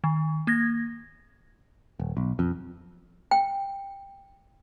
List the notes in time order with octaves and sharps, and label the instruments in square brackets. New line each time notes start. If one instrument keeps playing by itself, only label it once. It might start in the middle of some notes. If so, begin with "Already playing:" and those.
[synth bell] D#3
A#3 G#6 A#6
[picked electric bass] D#1
B1
F2
[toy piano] G5